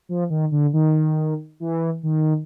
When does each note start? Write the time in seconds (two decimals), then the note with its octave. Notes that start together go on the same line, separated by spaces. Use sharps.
0.09 F3
0.30 D#3
0.52 D3
0.73 D#3
1.60 E3
2.03 D#3